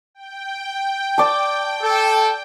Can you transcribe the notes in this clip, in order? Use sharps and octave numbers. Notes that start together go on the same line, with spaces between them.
G5
D5 A5
A4